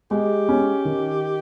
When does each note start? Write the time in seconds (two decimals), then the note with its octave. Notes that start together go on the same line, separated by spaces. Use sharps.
0.11 G#3 G4
0.49 C#4
0.85 D#3